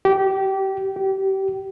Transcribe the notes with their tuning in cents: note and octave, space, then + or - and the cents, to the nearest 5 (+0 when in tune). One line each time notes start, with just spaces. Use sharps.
G4 -20
G4 -25